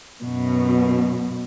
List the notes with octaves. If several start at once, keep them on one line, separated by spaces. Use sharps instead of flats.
F#2 B2